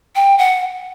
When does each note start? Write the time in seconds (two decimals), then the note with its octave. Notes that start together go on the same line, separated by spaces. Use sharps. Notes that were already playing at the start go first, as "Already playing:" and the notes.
0.15 G5
0.38 F#5